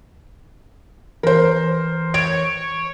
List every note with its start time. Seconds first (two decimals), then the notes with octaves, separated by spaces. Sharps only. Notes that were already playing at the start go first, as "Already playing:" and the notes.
1.23 E3 A#4 C5
2.14 C#5 D7